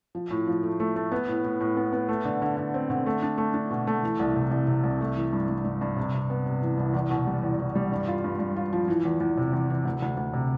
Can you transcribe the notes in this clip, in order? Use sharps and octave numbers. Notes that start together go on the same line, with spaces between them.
F3
A2
F3
A3
A3
A3
B3
A2
A2
A2
B3
B3
A3
D3
D3
D3
C4
D3
A3
D4
A3
D4
B2
A3
E3
C2
C3
C2
C3
C2
A3
E3
G2
G2
G2
G2
C3
C3
B3
C3
E3
C2
E2
B2
G3
E2
E2
G3
G2
F4
G2
G2
F4
F3
E3
E2
E2
C3
E2
E3
D2
D2
D2
C3